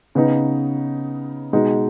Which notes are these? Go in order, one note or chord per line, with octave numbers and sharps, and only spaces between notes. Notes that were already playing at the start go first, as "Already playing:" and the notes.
C#3 B3 D#4
B2 G#3 D#4